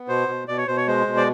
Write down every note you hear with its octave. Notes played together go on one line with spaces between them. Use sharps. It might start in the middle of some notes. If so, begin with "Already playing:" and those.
Already playing: B3
B2 C5
B2
B2 D5
C#5
B2 C5
C#5
G#3 C5
B2
D5